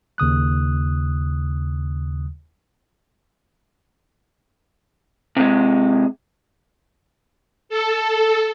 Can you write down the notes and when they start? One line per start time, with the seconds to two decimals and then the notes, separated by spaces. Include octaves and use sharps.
0.18 D#2 C#3 D#6 F#6
5.37 C3 G#3
7.69 A4